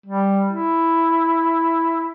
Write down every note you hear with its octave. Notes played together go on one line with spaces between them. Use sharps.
G3
E4